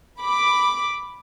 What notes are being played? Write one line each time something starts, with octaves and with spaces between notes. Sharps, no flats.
B5 D6